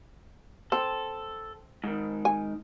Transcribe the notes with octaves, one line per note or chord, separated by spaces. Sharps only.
C4 A4
G#2 D#3
G#5